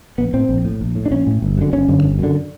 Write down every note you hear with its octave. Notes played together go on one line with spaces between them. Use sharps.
A#1 B3
A2 C4
A#1
A2
A#1
A2
D4
A#1 C#4
A2
G1
F#2 D3
G1 C#4
F#2 D3
G1
F#2 D3